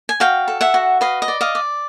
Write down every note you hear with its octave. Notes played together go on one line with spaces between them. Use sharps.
G#5
F#4 F5 G5
A4
E5 F#5
F#4
B4 D#5 F5
D#5
D5
D#5 F5
D5